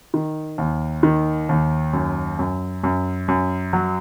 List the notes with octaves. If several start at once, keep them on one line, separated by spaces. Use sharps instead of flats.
D#3
D#2
D#3
D#2
F#2
F#2
F#2
F#2
F#3